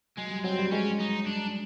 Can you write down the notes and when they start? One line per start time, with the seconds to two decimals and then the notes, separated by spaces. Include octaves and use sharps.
0.17 F#3 G#3
0.31 G3
0.44 F#3 C4
0.59 G3
0.72 G#3 C#4
1.00 D#4
1.26 D4